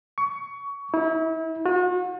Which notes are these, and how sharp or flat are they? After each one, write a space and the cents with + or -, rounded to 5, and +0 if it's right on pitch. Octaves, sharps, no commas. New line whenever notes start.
C#6 +25
E4 -35
F#4 -40